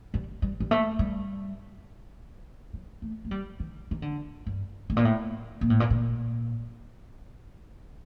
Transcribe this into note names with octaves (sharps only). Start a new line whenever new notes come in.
G3
G3
G3
A3
G3
F#3
A3
A3
G3
D#3
D#3
D3
G2
A2
A#2
A2
A#2
A2
A#2
A#2